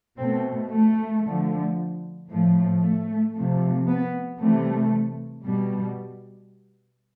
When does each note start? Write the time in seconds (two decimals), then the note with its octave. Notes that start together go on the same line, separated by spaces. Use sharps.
0.17 B2 A3 C4
0.70 A3
1.23 D3 F3 A3
2.29 A2 F3 A3
2.81 A3
3.34 C3 F3 A3
3.87 B3
4.39 C3 E3 G3 A3
5.44 B2 G3